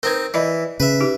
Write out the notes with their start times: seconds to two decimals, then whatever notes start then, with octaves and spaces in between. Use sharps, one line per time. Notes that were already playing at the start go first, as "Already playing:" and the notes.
0.03 C4 D#4 A#4 B4
0.34 E3 D5 D#5 B5
0.80 C#3 B4 E5
1.01 D#4 G4